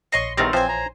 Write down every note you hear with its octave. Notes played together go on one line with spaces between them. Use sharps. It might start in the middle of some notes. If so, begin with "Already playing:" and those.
A#1 C#5 D#5 C6 C#6 C7
E2 D#3 G3 A3 C4 A#4
E3 F3 C4 C5 G#5
A#5